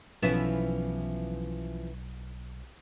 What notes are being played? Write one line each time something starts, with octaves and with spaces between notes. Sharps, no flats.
B1 E3 F3 B3 C#4 E4